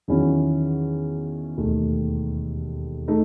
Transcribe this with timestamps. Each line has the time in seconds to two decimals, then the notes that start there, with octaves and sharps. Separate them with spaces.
0.08 E2 D#3 F#3 C#4 E4
1.57 E1 D#2 D#3 A3
3.08 A3 D#4